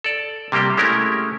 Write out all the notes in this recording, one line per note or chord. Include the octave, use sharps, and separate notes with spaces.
A4 D5
C3 G3 A#3 G4 G5
G#3 A3 C#4 E4 G4 A#4